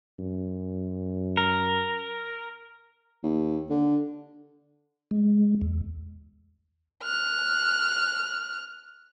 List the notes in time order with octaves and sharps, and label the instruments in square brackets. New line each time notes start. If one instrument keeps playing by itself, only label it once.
[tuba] F#2
[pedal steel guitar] A#4
[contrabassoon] D#2
D3
[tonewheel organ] G#3
E2
[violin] F6 F#6